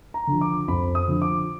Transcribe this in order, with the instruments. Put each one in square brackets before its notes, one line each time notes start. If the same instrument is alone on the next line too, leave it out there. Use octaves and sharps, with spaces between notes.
[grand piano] A#5
D3 F3
D6
F2 B5
D#6
D3 F3
D6